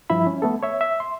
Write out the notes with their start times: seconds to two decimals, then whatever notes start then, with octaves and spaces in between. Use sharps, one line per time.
0.10 G2 F3 E4 E5 B5
0.27 C#4
0.42 A3 B3 A4
0.63 C#5 E5
0.81 E5
1.00 C6